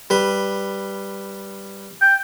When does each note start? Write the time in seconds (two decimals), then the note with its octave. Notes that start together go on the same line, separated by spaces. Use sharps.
0.10 G3 B4
2.02 G5